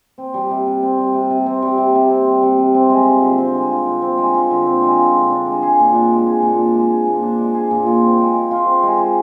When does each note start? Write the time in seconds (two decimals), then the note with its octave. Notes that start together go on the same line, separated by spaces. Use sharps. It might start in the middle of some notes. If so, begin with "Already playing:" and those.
0.18 C4
0.34 G3
0.51 C3
0.67 C3
0.83 C4
0.99 G3
1.14 C3
1.30 C3
1.46 C4
1.62 G3
1.78 C3
1.95 C3
2.10 C4
2.26 G3
2.43 C3
2.59 C3
2.75 C4
2.90 G#3
3.06 F4
3.22 D3
3.38 C4
3.55 G#3
3.71 F4
3.86 D3
4.02 C4
4.18 G#3
4.34 F4
4.51 D3
4.66 C4
4.83 G#3
4.98 F4
5.15 D3
5.30 D4
5.46 G#3
5.62 G#4
5.79 A#2
5.94 D4
6.11 G#3
6.26 G#4
6.42 A#2
6.58 D4
6.74 G#3
6.90 G#4
7.07 A#2
7.23 D4
7.39 G#3
7.54 G#4
7.71 A#2
7.86 F4
8.02 C4
8.18 G#3
8.34 G#3
8.51 F4
8.66 C4
8.83 G#3
8.98 G#3